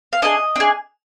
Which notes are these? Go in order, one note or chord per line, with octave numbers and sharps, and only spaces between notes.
F5
D4 G#4 D#5
D4 G#4